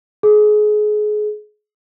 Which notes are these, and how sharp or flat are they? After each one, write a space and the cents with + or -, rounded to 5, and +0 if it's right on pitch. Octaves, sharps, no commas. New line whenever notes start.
G#4 +30